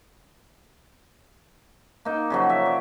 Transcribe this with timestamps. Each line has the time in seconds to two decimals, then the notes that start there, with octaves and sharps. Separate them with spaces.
2.05 A#3 D#4
2.30 C#3 F3 F#3
2.50 E5
2.66 D5